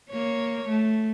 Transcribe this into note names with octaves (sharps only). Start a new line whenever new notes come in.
A#3 C#5
A3